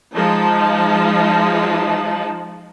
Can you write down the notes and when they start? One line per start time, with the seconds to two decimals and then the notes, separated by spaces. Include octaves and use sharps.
0.15 F3 G#3 D#4 A5